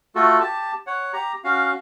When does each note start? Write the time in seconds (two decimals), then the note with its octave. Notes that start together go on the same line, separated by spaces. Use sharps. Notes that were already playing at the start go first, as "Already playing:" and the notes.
0.16 A3 F4 F#4 A4
0.41 G4 A5
0.87 C#5 F#5
1.13 G4 A#5
1.44 C#4 F#4 F5